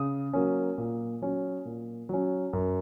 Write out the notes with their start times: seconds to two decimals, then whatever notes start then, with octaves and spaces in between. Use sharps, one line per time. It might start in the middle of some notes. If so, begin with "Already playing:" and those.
Already playing: C#3 D#6
0.33 F#3 A#3 C#4
0.78 A#2
1.22 F#3 C#4
1.65 A#2
2.09 F#3 C#4
2.53 F#2